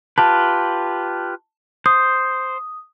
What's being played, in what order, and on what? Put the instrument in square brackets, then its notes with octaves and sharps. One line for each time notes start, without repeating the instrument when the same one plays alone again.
[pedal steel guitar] F4 G4 B4 [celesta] A5
[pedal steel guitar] C5 [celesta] D#6